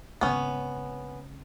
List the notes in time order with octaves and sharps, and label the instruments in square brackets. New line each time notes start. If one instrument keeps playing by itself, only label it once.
[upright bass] G#1 C#3 [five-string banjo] B3 C#4